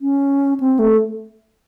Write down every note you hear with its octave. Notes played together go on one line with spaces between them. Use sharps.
C#4
C4
A3